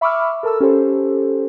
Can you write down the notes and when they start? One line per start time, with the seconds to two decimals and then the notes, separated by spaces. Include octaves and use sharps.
0.01 E5 B5 C#6 D6 E6 F6
0.43 A4 A#4 A5 E6
0.60 C#4 G4 A4 C5